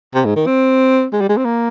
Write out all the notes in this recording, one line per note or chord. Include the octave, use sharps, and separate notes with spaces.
C3
G#2
D#3
C4
G#3
G3
G#3
C4
A#3